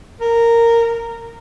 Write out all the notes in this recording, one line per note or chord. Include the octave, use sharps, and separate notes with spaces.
A#4